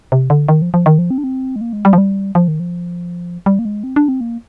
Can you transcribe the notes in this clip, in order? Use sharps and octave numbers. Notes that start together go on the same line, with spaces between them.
C3
D3
D#3
F3
F3
D#3
F3
C4
D4
C4
G#3
A#3
G#3
G3
F3
G3
F3
D#3
F3
G3
A#3
G#3
C4
D4
C4
A#3